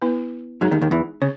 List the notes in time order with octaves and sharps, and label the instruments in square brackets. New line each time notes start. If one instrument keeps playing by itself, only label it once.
[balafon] B3 E4 B4
[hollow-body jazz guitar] F#2 F#3 [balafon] G#3 D#4 G#4
[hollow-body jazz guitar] D#2 D#3
D#2 D#3
E2 E3
[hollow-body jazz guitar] C#3 [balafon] C#5